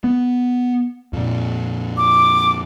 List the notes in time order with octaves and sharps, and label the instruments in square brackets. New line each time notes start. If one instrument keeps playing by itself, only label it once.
[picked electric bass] B3
F2 A#2
[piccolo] D6